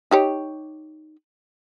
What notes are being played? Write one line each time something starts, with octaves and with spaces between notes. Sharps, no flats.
D#4 G4 C#5